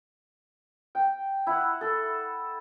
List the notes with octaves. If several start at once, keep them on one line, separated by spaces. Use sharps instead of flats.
G5
E4 F#5
A4